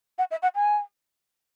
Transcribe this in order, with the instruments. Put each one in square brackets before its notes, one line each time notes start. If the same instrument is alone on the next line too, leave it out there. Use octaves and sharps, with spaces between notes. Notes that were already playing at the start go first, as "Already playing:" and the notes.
[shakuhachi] F#5
E5
F#5
G#5